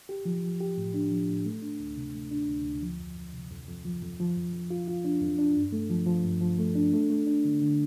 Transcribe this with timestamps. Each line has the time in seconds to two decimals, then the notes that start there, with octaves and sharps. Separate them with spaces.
0.09 G4
0.25 F3
0.43 F3
0.61 G4
0.77 A2
0.94 D4
1.11 F3
1.29 A2
1.45 A3
1.62 D4
1.80 D2
1.97 C3
2.14 A3
2.31 D4
2.47 D2
2.65 D2
2.82 F3
2.99 F2
3.16 F2
3.33 C3
3.51 F2
3.68 F2
3.85 F3
4.02 F2
4.20 F3
4.37 F2
4.53 F2
4.70 F4
4.88 F4
5.04 D4
5.22 F2
5.39 D4
5.56 G2
5.72 A3
5.90 F3
6.07 F3
6.25 G2
6.41 F3
6.59 A3
6.75 D4
6.93 A3
7.10 A3
7.27 D4
7.45 D3
7.61 D3